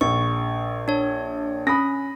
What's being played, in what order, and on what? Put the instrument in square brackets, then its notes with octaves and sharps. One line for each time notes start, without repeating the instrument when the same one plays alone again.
[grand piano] A#1 [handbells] C#6
[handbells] D4 C#5
[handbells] C#4 [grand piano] B5 D#6 A#6